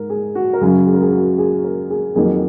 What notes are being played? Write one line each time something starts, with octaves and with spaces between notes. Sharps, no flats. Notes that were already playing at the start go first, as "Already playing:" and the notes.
Already playing: G#2 A#4
G#4
F#4
A#4
F#2 C#3 F#3 G#4
G#4
A#4
G#4
F#4
G#4
A#4
G#4
F2 D#3 F#3 A#3 G#4